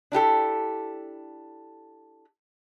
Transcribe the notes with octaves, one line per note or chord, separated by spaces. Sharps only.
D4 E4 G4 A4